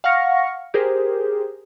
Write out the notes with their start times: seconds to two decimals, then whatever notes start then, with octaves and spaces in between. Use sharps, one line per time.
0.04 F5 F#5 C#6 F6 A#6 C#7
0.74 G4 G#4 A#4 C5